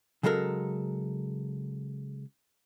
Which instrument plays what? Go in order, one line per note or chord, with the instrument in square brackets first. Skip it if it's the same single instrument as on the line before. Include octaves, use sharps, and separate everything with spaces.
[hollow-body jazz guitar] C#3 F#3 G#3 A4 A#4